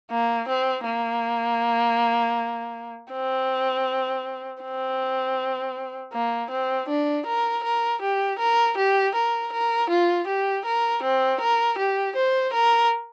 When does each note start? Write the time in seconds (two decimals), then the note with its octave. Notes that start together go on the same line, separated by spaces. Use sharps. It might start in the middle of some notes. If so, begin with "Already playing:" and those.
0.11 A#3
0.48 C4
0.86 A#3
3.12 C4
4.63 C4
6.13 A#3
6.51 C4
6.89 D4
7.26 A#4
7.64 A#4
8.02 G4
8.39 A#4
8.77 G4
9.15 A#4
9.53 A#4
9.90 F4
10.27 G4
10.65 A#4
11.03 C4
11.41 A#4
11.78 G4
12.16 C5
12.53 A#4